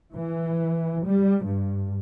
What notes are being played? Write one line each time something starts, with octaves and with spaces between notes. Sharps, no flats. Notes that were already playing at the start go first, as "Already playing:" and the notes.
E3
G3
G2